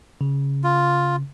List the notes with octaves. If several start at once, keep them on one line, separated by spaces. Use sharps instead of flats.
C#3
F4